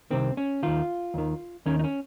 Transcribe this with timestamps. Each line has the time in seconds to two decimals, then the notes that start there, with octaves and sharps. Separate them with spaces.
0.11 C2 C3 D#3 C4
0.37 C#4
0.63 D#2 D#3 F4
1.14 D#2 D#3
1.66 D#2 D#3 C#4
1.79 D#4
1.84 C#4